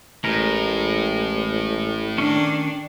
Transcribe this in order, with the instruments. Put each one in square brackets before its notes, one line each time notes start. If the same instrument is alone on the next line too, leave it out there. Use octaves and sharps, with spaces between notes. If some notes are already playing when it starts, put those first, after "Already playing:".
[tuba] A1 [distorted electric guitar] A2 [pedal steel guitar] G#3 A#4
[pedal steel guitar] D#3 C#4 [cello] D4